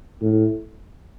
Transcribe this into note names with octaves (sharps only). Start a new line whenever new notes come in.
A2